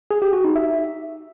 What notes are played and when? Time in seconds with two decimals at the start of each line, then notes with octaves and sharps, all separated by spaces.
0.11 G#4
0.22 G4
0.33 F#4
0.44 D#4
0.56 E5